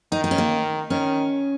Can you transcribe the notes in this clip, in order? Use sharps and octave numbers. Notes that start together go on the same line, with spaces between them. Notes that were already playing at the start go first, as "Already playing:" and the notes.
D#3 D#4
D#4
C#4
A#3
D#3 C#4